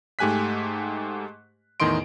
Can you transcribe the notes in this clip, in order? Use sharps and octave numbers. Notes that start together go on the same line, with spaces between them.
G#2 A3 G4 G#5 F#6 B6
E2 A2 D#3 D#5 C6 D7